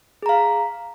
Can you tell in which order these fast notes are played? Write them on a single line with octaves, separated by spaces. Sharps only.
G#4 A#5 F5